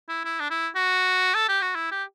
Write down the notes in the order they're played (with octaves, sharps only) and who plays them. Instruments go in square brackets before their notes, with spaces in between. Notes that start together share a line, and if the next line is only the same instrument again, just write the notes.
[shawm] E4
E4
D4
E4
F#4
A4
G4
F#4
E4
G4